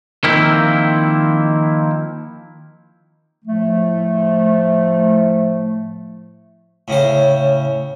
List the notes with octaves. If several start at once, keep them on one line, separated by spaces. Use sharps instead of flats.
D#3 F3 A#3 C4 E4
A2 F3 A3
A2 C#3 C5